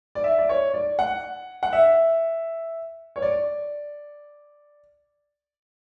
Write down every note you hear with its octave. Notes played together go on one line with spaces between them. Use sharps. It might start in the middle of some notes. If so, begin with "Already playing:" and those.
D5
E5
D5
C#5
D5
F#5
F#5
E5
C#5
D5